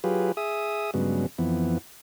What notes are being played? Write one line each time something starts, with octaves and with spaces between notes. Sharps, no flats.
F#3 F4 G4 G#4 B4
G#4 E5 D#6
G2 C#3 F#3 G#3 B3
F2 E3 B3